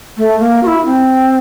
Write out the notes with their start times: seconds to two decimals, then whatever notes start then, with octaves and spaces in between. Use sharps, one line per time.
0.17 A3
0.39 A#3
0.63 F#4
0.67 E4
0.85 C4